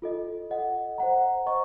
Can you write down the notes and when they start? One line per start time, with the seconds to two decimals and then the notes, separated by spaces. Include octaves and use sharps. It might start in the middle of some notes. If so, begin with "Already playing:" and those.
0.02 F4 A4 D#5
0.50 A4 D#5 F#5
0.98 C5 F#5 A#5
1.46 C5 D#5 A#5 C#6